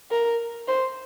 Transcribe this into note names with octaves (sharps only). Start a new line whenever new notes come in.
A#4
C5